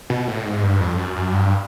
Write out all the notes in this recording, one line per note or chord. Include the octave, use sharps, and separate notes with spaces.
B2
A2
G#2
G2
F2
F#2
F#2
G2